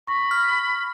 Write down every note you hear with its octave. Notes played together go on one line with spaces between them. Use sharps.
B5 C#6 A#6
F6